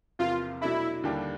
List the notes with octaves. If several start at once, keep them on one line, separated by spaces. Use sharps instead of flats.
E2 C3 F3 A#3 F4
B2 F#3 A3 D4 E4
D#2 D3 G3 A#3 D4